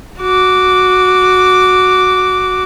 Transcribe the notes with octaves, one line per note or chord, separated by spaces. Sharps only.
F#4 D6